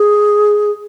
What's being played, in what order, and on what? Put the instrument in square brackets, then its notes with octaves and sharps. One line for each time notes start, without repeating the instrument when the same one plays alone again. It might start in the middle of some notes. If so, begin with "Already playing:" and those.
Already playing: [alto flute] G#4